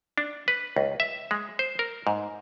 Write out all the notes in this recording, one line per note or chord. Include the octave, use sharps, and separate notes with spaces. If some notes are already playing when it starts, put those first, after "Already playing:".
D4
B4
C#2
E5
G#3
C5
A#4
G#2